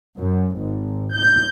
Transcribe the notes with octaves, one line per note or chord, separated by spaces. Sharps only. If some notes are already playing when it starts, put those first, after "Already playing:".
F#2
G#1
G6